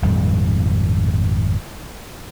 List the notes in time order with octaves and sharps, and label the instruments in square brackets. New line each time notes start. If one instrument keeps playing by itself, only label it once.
[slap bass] G#1 F2 A#2 G3